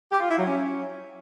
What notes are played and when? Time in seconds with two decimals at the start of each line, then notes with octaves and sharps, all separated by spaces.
0.12 G4
0.20 F4
0.29 E4
0.37 F#3
0.46 C#4